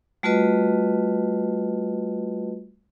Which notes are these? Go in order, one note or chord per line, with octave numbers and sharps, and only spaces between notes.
G3 A3 F4 F#4 B4 D#5